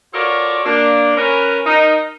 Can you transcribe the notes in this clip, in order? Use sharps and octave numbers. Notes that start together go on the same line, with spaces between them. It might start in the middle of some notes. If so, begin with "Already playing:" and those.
F4 F#4 A4 A#4 C#5 D5
A#3 D4
C#4 A#4 B4
D#4 A#4